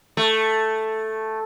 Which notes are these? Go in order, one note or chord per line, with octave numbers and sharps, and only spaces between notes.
A3